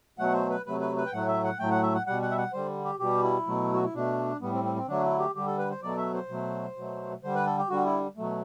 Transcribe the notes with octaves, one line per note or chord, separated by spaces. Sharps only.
B2 F#3 A3 F#5
C5
B4
C3 F#3 A3 B4
B4
B4
G5
A2 F#3 A3 F#5
E5
F#5
A2 F#3 A3 G5
F#5
E5
F#5
B2 G3 F#5
F#5
E5
F#5
D3 G3 C5
G4
B2 G3 G4
E4
B2 F#3 A3
F#4
E4
B2 A3 D4
A2 G3 B3
C4
C4
C4
D3 F#3 A3 D4
E4
G4
D3 G3 G4
A4
B4
C5
B2 F#3 A3 D5
E5
C5
B2 F#3 A3
B2 F#3 A3
D3 G3 C5
B4
A4
G4
D3 G3 F#4
E4
B2 F#3 A3